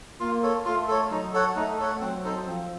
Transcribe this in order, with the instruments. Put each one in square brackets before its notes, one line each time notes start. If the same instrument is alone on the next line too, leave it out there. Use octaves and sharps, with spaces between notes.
[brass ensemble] A#3 [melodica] F4
[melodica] A4 C#5
[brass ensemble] A3 [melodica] F4
[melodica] A4 C#5
[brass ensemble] F#3 [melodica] D#4
[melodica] A4 C#5 F#5
[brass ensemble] A3 [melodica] D#4
[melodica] A4 C#5 F#5
[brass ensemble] F#3 [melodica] C4
[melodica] D#4 A4 C5
[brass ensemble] F3 [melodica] C4